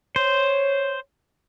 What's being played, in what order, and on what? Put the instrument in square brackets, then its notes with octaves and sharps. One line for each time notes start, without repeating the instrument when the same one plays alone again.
[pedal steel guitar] C5 [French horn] C#5